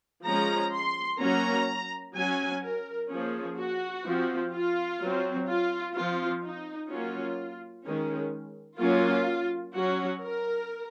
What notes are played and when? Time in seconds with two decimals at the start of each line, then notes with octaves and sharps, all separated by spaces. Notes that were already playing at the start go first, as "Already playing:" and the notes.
0.25 F3 G#3 C#4 A#5
0.73 C6
1.20 F#3 A#3 C#4 A#5
2.15 F#3 C#4 G#5
2.63 A#4
3.09 F3 A#3 C#4 G#4
3.57 F#4
4.05 F3 C4
4.52 F4
5.00 F#3 C4
5.47 F4
5.94 F3 C4 F4
6.42 D#4
6.89 F#3 A#3 C#4 F4
7.85 D#3 G#3 C#4
8.79 F#3 A#3 C#4 F4
9.74 F#3 C#4 F#4
10.22 A#4